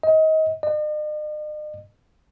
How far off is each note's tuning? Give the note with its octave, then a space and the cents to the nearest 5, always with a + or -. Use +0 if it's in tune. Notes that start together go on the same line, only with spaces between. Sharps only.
D#5 +25
D#5 -45